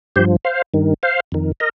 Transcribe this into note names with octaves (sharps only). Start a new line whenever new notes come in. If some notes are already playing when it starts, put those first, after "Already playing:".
G2 F3 G4 C5
C5 F5
G2 D#3
C5 F5
F2 D#3
A#4 D#5